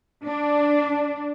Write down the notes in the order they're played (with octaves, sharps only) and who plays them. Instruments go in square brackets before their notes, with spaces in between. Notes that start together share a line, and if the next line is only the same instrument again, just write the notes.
[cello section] D4